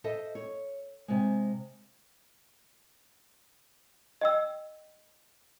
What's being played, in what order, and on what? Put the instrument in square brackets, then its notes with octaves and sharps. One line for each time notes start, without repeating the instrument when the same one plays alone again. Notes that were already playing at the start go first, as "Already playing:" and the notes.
[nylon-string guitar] A4 C5 D#5 E5
C#5
C3 G#3
[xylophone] D#5 G5 E6